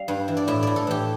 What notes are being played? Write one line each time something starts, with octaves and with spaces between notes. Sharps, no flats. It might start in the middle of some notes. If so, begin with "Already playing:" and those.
Already playing: G3 F5
G2
E3
D5
A2 E5
A2 D5
A4
E3 G4